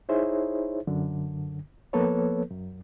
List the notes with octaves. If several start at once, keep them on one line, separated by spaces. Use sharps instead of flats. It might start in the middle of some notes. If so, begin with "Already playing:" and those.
D#4 E4 G#4 C5 C#5 E5
F#2 D3
F3 A#3 B3 A4 B4 C#5
F#2